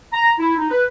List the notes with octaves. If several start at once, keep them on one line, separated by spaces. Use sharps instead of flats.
A#5
E4
D#4
B4